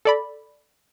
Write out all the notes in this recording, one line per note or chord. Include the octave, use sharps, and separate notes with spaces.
A4 D5 B5